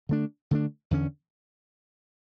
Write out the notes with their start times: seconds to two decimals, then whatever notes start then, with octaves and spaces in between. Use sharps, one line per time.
0.09 D3 A3 D4
0.51 D3 A3 D4
0.91 E2 D3 A3 C#4